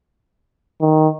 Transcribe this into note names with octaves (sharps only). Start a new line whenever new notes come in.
D#3